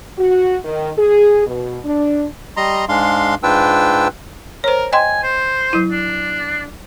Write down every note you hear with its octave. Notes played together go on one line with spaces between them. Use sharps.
F#4
D#3
G#4
B2
D4
G3 D#5 A#5 C6
G#2 G#3 D4 F5 C6
G#2 D4 F4 B4 G5 E6
A#4 C5 C#5
D#5 G5 G#5 C6
C5
F#3 E4
D4